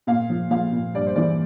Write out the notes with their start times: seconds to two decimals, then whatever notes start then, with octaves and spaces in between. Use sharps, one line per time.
0.07 A#2 F5
0.30 F3
0.51 F3 F5
0.72 A#2
0.95 G2 D5
1.06 C5
1.16 E3 D5